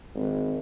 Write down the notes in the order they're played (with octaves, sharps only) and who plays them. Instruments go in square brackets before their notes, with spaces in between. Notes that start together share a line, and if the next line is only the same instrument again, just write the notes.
[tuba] G#1